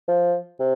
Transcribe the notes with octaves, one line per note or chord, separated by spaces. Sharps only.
F3
C3